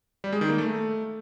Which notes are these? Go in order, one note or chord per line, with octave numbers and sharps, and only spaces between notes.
G3
G#3
D#3
A#3
A3